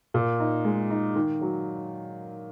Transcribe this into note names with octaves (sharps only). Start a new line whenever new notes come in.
A#2
D#4
G#3
D#4
D#3
F#3